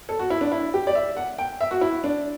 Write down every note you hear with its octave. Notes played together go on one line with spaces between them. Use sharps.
A4
F#4
E4
D4
E4
G4
D5
E5
F#5
G5
E5
F#4
E4
D4